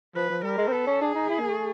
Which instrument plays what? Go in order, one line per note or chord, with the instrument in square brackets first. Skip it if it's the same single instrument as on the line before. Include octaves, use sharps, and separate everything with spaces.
[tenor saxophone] F3 [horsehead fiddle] B4
[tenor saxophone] F3
[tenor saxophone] G3 [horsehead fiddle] A#4
[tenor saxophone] G#3
C4
[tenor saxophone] B3 [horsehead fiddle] A4
[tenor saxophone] C#4
[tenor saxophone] D4 [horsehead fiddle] G#4
[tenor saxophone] D#4
E4
A#3
A3